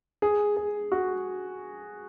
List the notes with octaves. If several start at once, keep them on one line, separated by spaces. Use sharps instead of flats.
G#4
G#4
F#4